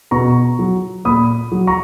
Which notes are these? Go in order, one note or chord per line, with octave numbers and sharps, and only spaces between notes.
B2 A#5 C#6
F#3
A#2 B5 D#6
F#3
A#5 C#6